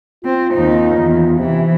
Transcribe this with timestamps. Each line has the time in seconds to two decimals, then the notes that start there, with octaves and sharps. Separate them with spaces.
0.25 C4 F4
0.54 D#2 D#4
1.00 E2
1.39 C3 E3